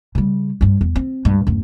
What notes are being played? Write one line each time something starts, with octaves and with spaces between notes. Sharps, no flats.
C#3 G3
G2 F3
E2
C4
C#2 G2
D1 F#2